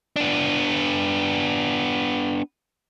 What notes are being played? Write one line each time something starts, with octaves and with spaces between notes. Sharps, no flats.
B3 D4